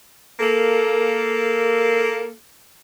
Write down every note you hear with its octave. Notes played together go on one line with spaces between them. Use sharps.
A#3 A4